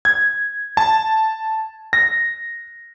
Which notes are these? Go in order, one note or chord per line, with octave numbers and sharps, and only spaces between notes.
G#6
A5
A#6